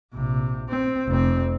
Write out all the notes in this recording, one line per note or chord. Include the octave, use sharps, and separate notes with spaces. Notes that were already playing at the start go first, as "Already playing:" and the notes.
A#1 C3
C4
F1 C4